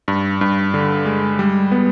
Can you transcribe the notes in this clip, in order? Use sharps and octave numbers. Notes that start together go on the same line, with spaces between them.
G2
G2
D3
G#3
G3
B3